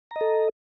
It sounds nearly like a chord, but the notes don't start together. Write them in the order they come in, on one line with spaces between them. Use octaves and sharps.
A#5 D#5 A4